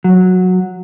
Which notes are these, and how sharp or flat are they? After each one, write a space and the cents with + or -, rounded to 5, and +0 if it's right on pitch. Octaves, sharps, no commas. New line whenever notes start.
F#3 -10